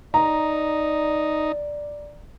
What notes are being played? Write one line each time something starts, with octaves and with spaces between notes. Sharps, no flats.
D#4 D5 A#5